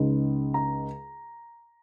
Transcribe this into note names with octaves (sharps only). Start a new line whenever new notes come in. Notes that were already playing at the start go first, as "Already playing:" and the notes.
Already playing: C#2 C#3 G#3 D#4
A#5